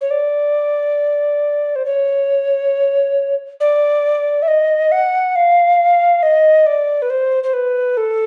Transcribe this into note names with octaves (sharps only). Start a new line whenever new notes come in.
C#5
D5
C5
C#5
D5
E5
D#5
F#5
F5
D#5
D5
B4
C5
C5
B4
A4